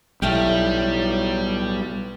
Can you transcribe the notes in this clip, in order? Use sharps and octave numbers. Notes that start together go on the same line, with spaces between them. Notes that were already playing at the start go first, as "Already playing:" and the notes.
B1 A2 G3 A3 F5 G5